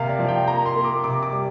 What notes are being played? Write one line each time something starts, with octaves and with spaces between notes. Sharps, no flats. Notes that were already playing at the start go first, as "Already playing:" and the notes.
Already playing: C3 A#3 F5
D5
F3
G5
A#3 A#5
C6
A#3
D6
C3 D6
D6
G3